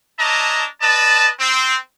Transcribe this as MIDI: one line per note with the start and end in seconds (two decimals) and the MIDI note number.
0.19 0.65 62
0.19 0.65 64
0.19 0.65 73
0.19 0.65 75
0.19 0.65 81
0.19 0.65 82
0.81 1.29 71
0.81 1.29 74
0.81 1.29 75
0.81 1.29 81
1.40 1.76 60